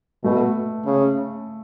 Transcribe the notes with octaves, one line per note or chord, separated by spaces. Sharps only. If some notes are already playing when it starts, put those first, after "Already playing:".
B2 A3
C#3